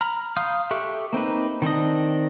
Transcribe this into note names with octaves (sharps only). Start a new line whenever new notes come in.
A#5 B5 F6
F5 C6 D#6 F6 G6
G4 A4 E5 C#6 F#6
A#3 C4 D#4 B4
D#3 C4 D4 D#5